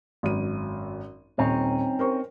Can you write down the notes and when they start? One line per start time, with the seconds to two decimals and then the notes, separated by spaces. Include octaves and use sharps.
0.23 G#1 F#2 D#7
1.39 D#1 C4 C#4 D#4
1.99 A#4 C5 C#6